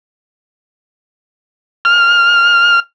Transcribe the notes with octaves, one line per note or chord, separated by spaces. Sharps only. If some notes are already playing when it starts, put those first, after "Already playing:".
F6